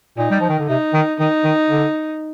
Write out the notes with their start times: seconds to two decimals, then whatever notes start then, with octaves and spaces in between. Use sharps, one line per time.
0.17 A#2 D#4
0.30 G3
0.41 F3
0.49 D#3
0.59 D3
0.68 C3 D#4
0.94 D#3
1.19 D#3 D#4
1.45 D#3
1.70 D3